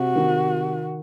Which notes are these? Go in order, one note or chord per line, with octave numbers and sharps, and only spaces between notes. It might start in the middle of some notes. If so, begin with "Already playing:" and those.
Already playing: C3 F#4
D#3